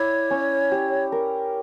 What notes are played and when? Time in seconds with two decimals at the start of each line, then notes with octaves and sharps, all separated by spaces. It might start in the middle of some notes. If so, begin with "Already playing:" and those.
Already playing: E4 C#5 D5
0.31 C#4
0.71 G4
1.12 A#4